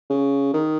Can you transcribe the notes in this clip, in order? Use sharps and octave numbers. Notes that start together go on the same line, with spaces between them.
C#3
D#3